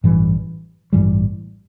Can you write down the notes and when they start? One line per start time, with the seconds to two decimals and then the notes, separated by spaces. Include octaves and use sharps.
0.04 A1 G2 E3 G3
0.93 A1 G2 E3 G3